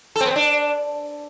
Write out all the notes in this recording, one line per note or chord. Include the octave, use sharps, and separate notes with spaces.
A4
C4
B3
C4
D4